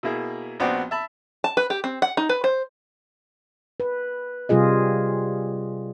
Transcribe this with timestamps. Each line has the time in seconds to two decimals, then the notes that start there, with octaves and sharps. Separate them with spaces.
0.03 B2 A#3 E4 G#4
0.60 A#1 B3 C4 F#4 D5 G5
0.91 E5 A5 B5
1.44 A5
1.57 B4
1.70 G4
1.84 C4
2.02 F#5
2.17 D#4
2.29 B4
2.44 C5
3.80 B4
4.49 C3 G3 F4 G#4 D#5